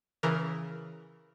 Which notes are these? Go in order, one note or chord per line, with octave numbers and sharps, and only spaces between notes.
C#3 E3 A#4